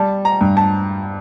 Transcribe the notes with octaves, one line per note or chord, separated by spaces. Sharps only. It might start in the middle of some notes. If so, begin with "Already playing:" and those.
Already playing: G3 A5
A#5
G2
A5